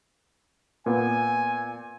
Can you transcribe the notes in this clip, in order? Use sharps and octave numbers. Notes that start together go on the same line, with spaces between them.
A#2 A#3 B3 G#5